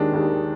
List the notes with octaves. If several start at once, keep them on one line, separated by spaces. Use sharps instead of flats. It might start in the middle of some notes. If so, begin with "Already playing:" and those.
Already playing: D#2 D#3 G#3 D4
D#2 D#3 G#3